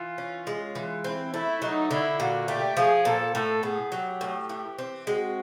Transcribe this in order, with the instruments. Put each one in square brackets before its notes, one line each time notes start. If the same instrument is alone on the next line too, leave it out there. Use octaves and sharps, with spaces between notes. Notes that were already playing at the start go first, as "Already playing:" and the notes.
Already playing: [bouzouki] E3 [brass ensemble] F4
[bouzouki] C#4
G#3
E3
[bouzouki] C4 [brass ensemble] E4
[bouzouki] A3 [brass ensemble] E4
[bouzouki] F#3 [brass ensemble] D#4
[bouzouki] D3 [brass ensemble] E4
[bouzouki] A#2 [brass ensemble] F#4
[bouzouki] A3 [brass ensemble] G4
[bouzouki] F3 [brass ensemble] G#4
[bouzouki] A#2 [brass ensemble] A4
[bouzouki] A2 [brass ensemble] A4
[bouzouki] B3 [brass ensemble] G#4
[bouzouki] F#3 [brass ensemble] G4
[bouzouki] A2
E3
C4
[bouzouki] G#3 [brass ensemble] F#4